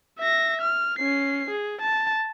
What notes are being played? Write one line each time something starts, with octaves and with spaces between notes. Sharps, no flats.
E5 A#6
F6
C#4 C7
G#4
A5